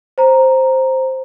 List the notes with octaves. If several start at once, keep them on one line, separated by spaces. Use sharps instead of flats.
C5 A#5